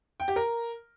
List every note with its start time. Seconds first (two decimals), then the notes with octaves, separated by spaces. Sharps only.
0.20 G5
0.28 G4
0.36 A#4